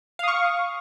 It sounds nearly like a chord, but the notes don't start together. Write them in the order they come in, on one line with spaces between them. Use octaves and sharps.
F5 D#6 C#6